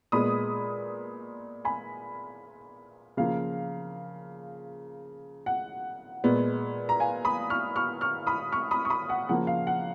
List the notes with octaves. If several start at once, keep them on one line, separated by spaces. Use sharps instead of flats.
A#2 G#3 B3 B5 D#6
G#5 B5
C#3 F3 A#3 F5
F#5
A#2 G#3 B3
A#5
F5 G#5
B5 D#6
C#6 F6
C#6 F6
C#6 F6
B5 D#6
C#6 F6
B5 D#6
C#6
B5 D#6
F#5
C#3 F3 A#3 F#5
F5
F#5